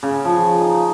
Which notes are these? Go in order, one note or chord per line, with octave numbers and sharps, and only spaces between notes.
C#3
F3
D#4